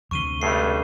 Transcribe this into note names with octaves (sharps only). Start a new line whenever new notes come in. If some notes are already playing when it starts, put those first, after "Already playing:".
D2 C3 C#6 D#7 G7
C#2 G2 A3 C7